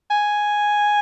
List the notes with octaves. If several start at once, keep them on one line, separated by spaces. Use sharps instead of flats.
G#5